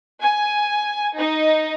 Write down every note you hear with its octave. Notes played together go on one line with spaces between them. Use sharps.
G#5
D#4